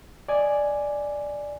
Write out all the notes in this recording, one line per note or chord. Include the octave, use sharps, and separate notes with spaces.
D5 D#5 G#5